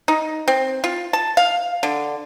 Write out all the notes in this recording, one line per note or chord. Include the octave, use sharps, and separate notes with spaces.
D#4
C4
F4
A5
F5
D3